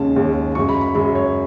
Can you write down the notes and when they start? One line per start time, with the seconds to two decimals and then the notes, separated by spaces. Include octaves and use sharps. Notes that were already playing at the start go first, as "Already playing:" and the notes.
Already playing: D#2 C#3 G#3 C#4 A5
0.16 D#2 C#3 G#3 C#4
0.55 F#2 C#3 G#3 C#6
0.69 B5
0.81 B5
0.95 F#2 C#3 G#3 B5
1.15 C#5